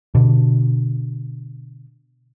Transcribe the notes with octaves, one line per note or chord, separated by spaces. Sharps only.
B2 D3